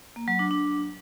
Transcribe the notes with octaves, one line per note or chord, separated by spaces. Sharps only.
A#3
F#3
D4
D4